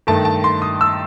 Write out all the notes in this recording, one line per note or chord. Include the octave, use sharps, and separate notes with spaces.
G2 D#3 A3 A5
A5
C6
D#6
E6